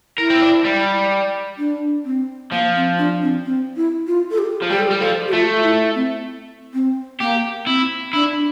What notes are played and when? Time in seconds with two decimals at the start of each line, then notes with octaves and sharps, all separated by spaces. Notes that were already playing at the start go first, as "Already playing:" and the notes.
0.18 E4 A#4
0.30 C4
0.42 D4
0.64 G3
1.58 D4
2.05 C4
2.52 F3 A#3
2.76 C4
2.98 D4
3.22 C4
3.45 C4
3.76 E4
4.07 F4
4.31 A4
4.38 G4
4.62 F3
4.70 G3 G4
4.80 A4
4.87 G4
4.90 G3
5.01 F3 A4
5.28 G4
5.32 A3 F4
5.63 E4
5.95 C4
6.74 C4
7.20 A#3 G4
7.67 C4 E4
8.13 D4 E4